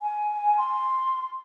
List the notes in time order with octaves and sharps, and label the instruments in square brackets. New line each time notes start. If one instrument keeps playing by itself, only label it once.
[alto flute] G#5
C6